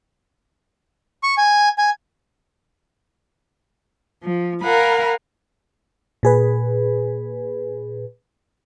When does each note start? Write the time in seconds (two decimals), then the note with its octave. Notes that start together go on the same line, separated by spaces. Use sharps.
1.23 C#6
1.38 G#5
1.78 G#5
4.22 F3
4.62 A#4 F5 F#5 G#5 B5
6.23 A#2 G#4 B4